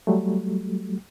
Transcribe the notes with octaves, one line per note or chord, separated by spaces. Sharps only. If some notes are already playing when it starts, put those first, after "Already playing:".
F#3 G3 A3